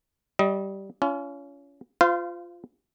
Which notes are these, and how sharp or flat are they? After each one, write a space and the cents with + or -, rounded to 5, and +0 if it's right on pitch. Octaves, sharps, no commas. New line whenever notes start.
G3 -10 D#5 +25
C#4 +30 F4 -30
F4 +0 C5 -35 F5 -20